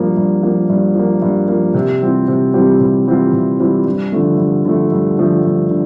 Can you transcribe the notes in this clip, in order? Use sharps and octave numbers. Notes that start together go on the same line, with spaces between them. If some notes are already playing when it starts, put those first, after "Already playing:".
Already playing: G2 F3 A#3
G2
F3 A#3
G2
F3 A#3
G2
F3 A#3
C3
E3 G3 C4 F4
C3
E3 G3 C4 F4
C3
E3 G3 C4 F4
C3
E3 G3 C4 F4
G2
D3 F3 A3
G2
D3 F3 A3
G2
D3 F3 A3
G2
D3